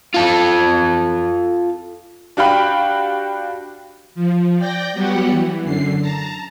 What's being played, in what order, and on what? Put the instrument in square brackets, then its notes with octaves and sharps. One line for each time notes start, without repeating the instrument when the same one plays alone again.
[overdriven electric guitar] F4 A4
[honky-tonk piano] D4 F#4 G4 F5 G5 B5
[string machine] F3
D5 G5 G6 A#6
F#3 G3 B3 F#4 G4 F#5
E3
F#2 D3 C7
A5 A#5